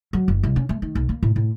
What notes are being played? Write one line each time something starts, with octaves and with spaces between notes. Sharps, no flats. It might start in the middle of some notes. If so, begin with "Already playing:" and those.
F#3
F#1
C2
C#4
A3
D#3
B1
A#3
A2
A2